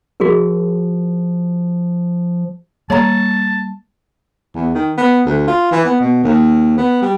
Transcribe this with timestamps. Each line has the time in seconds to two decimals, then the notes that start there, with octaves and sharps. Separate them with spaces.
0.20 F3 F#4 G#4 A#4
2.90 G3 A#3 C#5 A5 A#5
4.55 E2
4.75 D#3
4.98 B3
5.26 D2
5.48 F4
5.71 E3
5.85 B3
6.00 B2
6.24 D#2
6.78 B3
7.02 G3